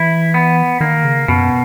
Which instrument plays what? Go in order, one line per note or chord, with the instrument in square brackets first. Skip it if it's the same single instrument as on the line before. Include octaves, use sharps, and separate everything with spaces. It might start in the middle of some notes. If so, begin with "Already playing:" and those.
Already playing: [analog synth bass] E3 [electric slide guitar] E4
[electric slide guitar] B3
[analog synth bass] D#3 [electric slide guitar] A#3
[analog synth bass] C#3
[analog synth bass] F#2 [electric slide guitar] B2